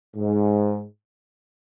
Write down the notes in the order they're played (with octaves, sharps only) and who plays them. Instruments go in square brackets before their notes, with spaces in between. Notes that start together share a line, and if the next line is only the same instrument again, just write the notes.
[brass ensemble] G#2